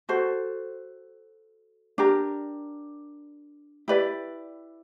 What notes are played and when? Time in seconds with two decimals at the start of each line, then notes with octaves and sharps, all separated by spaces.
0.09 F#4 A4 C5
1.98 D4 G4 A#4
3.88 E4 G4 B4 D5